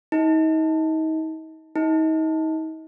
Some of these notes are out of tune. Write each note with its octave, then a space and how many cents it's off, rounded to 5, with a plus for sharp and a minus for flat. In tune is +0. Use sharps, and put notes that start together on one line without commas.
D#4 +35
D#4 +35